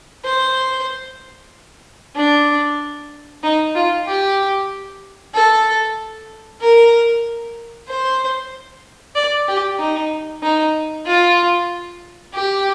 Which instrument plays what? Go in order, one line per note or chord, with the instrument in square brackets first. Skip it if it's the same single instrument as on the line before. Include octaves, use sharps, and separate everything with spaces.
[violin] C5
D4
D#4
F4
G4
A4
A#4
C5
D5
G4
D#4
D#4
F4
G4